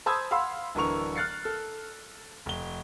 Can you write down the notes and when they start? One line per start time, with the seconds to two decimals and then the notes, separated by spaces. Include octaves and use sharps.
0.06 C5 A5 B5 D#6 E6 G#6
0.31 F5 F#5 B5 C6 E6
0.75 D1 D3 E3 A#4 C#6 F7
1.16 F6 F#6 A6 C7 C#7
1.45 A4
2.46 F1 G7